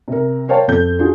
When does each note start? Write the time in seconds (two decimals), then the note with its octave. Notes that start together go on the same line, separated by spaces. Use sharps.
0.08 C3 A#4
0.48 A#4 C5 C#5 F5 G5 A5
0.68 F2 A4 G6
0.99 D4 F4 F#4 G#4